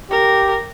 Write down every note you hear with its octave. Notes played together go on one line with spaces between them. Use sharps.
G4 A#4